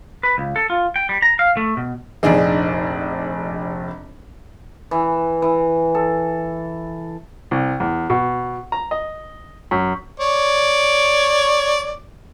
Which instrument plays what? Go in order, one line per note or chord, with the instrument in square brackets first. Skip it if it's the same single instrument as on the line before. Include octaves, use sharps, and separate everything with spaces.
[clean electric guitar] B4
C#2
A4
F4
G5
G3
A#5
F5
A3
B2
[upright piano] F1 A#1 [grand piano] D4 D#4 G#4
[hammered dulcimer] E3
E3
A4
[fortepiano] C2
E2
B2
A#5
D#5
F#2
[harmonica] C#5 D5